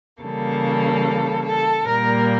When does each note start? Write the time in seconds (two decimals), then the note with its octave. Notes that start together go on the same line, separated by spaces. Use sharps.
0.23 C#3 E3 G3 A#3 A4
1.45 A4
1.86 A#2 G3 A#3 A#4